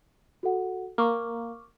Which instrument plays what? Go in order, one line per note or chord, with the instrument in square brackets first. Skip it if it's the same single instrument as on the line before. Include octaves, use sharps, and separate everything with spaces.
[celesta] F#4 A4 F#5
[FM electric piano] A#3 [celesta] C#6 D6 F6